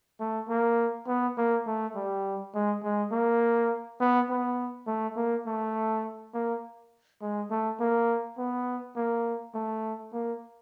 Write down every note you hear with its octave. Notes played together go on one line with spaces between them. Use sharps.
A3
A#3
B3
A#3
A3
G3
G#3
G#3
A#3
B3
B3
A3
A#3
A3
A#3
G#3
A3
A#3
B3
A#3
A3
A#3